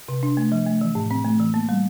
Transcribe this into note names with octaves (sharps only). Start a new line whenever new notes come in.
C3
D4
A3
F3
A3
E3
A2
C4
A3
E3
A#3
G3